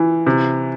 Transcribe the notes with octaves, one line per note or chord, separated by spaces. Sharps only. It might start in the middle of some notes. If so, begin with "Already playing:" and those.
Already playing: E3
C3